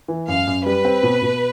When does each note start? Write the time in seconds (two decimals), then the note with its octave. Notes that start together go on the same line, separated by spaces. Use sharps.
0.08 E3
0.28 F#2 F5
0.47 F#2
0.65 G3 B4
0.85 C4
1.03 B2
1.22 B2